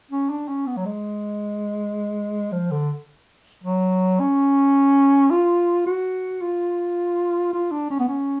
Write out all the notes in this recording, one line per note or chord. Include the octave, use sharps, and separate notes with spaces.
C#4
D4
C#4
B3
F#3
G#3
F3
D3
F#3
C#4
F4
F#4
F4
F4
D4
C#4
B3
C#4